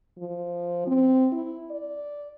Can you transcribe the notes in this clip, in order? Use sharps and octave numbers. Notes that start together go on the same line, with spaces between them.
F3
C4
E4
D5